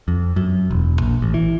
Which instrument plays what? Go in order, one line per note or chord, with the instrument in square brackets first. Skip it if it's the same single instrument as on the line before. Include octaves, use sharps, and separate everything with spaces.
[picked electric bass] F2
F#2
E1
A#1
A1
E3